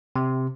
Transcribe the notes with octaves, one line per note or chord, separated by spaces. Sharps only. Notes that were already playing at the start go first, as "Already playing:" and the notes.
C3